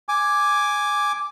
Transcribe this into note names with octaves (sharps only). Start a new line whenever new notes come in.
G#5 D6